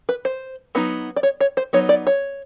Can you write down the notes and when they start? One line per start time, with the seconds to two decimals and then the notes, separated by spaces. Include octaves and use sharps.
0.09 B4
0.25 C5
0.75 F#3 B3 D#4
1.16 D5
1.23 C#5
1.41 C#5
1.57 C5
1.73 F#3 B3 D#4 C#5
1.89 D5
2.07 C#5